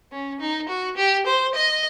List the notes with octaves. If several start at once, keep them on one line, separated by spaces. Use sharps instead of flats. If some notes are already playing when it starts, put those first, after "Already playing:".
C#4
D#4
F#4
G4
C5
D#5